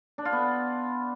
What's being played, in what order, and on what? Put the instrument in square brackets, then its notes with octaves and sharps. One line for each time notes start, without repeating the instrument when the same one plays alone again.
[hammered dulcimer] D4
F4
B3